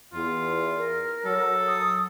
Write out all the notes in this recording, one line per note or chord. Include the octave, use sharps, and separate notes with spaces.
E2 F4
A#4
F#3 A4
D#6